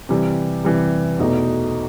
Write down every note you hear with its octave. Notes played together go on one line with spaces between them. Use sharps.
C3 E3 G3
C3 E3 G3
E2 B2 A3 D#4